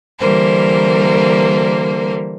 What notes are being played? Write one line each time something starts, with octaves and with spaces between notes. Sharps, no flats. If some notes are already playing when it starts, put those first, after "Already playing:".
D3 E3 G3 A#3 A#4 C5